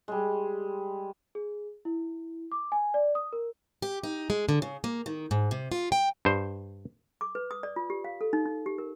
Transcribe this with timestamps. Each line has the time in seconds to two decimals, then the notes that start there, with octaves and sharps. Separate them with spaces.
0.08 G3 G#3
1.35 G#4
1.85 E4
2.52 D6
2.72 G#5
2.94 D5
3.15 D#6
3.33 A#4
3.82 G4
4.03 D#4
4.30 G#3
4.49 D3
4.62 C#3
4.84 A#3
5.06 D#3
5.31 G#2
5.51 C3
5.72 F4
5.92 G5
6.25 G2 C5
7.21 D6
7.35 B4
7.51 D#6
7.63 D5
7.76 F4
7.90 G4
8.04 F5
8.21 A4
8.33 D#4
8.46 D#4
8.66 G4
8.78 A#4